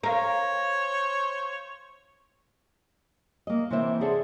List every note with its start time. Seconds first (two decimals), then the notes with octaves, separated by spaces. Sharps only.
0.03 A#4 C5 C#5 F5
3.47 A#3 D#5
3.71 C3 E3 A#3 C5 E5
4.01 G#4 A4 C5 D5 E5 F#5